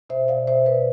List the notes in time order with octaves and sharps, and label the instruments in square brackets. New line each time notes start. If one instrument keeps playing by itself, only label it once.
[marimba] B2 C5 E5
B2 D5 F5
B2 C5 E5
B2 B4 D5